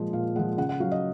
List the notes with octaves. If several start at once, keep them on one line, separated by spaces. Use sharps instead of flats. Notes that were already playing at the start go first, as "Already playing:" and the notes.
Already playing: A#2 F3 G#3
A#2 F5
F3 G#3 F#5
C#3 F#5
F#5
F#3 F5
D#5